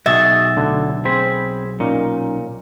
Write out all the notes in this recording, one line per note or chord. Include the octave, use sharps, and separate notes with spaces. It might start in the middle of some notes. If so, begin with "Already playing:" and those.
B1 F#4 G#4 D#5 E5 A6
D2 D3
C4 G#4 C5 B5
A#2 C#4 D#4